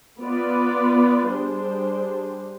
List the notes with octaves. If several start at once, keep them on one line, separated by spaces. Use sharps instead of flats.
B3 F4 B4 D5
G3 D4 G#4 C5